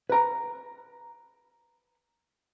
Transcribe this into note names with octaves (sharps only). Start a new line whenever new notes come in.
B4 A#5